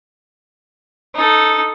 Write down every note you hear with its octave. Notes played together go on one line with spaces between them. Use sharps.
D#4 A4